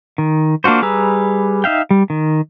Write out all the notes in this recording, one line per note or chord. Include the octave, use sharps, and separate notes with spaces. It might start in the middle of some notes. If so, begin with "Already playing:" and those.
D#3
A#3 D4 F4 F#4 C5
G3 G#4 B4 A#5 E6
D#4 E5 F5 G5
G3
D#3